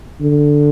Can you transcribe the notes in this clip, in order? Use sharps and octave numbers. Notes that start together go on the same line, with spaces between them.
D3